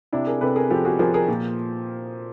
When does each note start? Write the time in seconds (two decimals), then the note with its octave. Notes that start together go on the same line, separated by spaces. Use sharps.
0.13 C3 D4 E4
0.27 G#4 A#4
0.41 C3 A4 B4
0.56 G#4 A#4
0.70 F3 G4 A4
0.85 F#4 G#4
0.99 F3 G#4 A#4
1.14 G#4 A#4
1.28 A#2